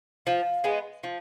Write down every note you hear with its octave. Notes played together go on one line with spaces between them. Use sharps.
F3 F5
G#3 B3
F3